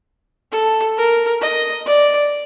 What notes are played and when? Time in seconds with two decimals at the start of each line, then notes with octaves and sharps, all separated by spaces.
0.52 A4
0.97 A#4
1.41 D#5
1.86 D5